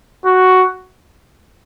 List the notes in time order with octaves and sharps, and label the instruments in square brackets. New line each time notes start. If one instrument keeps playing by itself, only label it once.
[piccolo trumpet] F#4